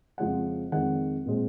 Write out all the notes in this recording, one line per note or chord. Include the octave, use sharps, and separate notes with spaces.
F2 C#3 F3 G#3 C4 F#5
F2 D#3 G#3 C4 F#5
A#2 G#3 C4